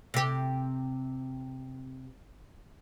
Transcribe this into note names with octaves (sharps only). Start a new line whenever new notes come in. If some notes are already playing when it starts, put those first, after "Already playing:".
C3 G4